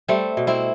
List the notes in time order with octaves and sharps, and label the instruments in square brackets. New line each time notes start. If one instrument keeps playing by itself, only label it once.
[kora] G3 A3 C4
B2
C4 E4